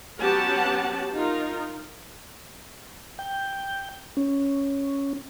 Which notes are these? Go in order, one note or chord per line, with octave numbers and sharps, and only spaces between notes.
F#3 B3 C#4 G4 F#5 A5
D#4 F4 A#4
G5
C#4